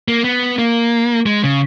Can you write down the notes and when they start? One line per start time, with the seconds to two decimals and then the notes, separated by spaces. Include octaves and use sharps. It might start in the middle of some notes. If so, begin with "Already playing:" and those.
0.08 A#3
0.24 B3
0.58 A#3
1.26 G#3
1.44 C#3